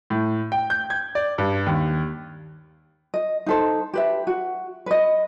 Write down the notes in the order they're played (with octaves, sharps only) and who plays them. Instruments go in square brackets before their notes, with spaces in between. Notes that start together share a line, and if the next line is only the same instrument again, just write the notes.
[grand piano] A2
G5
G6
G#6
D5
G2
D#2
[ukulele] D#5
D#4 A4 C5
G4 B4 E5
F#4
B4 D#5